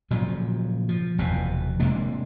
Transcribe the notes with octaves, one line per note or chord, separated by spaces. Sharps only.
A#2 C#3 F3 F#3
F3
F1 E2 B2
C3 G#3 A#3 D4